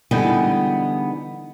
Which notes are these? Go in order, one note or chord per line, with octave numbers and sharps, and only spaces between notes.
D3 E3 G3 G#3 B3 D#4